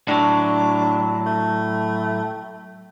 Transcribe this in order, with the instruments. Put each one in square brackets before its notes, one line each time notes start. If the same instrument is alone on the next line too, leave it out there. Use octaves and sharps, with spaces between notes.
[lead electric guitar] A2 F#3 [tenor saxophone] D4
[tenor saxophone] A3